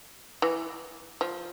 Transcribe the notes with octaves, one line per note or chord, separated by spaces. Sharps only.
E3
F3